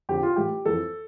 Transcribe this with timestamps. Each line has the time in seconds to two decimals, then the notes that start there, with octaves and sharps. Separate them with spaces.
0.09 F2 D3 G4
0.23 F4
0.36 A2 E3 G4
0.65 F2 E3 A4